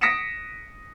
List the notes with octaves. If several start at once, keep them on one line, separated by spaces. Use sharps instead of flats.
D#6 A#6 B6 C#7 D7 E7